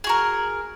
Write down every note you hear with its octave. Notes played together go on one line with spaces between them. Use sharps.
F#4 G#4 A#4